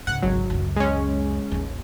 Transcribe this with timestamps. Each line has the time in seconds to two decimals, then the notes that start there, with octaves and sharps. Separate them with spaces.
0.07 C#2 G#2 F#5
0.22 G#1 F#3
0.50 C#2 F#2
0.76 G#3 C#4
1.52 A1 D#2